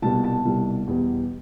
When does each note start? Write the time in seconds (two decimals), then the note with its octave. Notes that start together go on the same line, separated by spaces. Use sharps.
0.02 C2 B2 G3 A5
0.24 A5
0.45 C2 B2 G3
0.88 E2 B2 G3